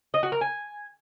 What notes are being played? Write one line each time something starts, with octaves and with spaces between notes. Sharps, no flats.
D#5
F#4
A#4
G#5